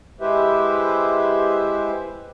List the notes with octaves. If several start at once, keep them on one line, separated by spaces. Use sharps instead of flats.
G#3 E4 G4 B4 C5 E5